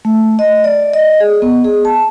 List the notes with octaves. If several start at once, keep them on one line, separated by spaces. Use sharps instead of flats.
A3
D#5
D5
D#5
G#4
B3
G#4
A5